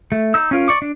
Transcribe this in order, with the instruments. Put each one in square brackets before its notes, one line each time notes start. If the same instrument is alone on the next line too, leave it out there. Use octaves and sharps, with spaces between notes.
[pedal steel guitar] A3
D#4 E6
C#4 F4 A#4
D5 C#6 D6
D4